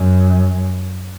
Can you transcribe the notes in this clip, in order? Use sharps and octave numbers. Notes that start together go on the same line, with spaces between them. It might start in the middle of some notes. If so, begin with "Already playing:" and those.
Already playing: F#2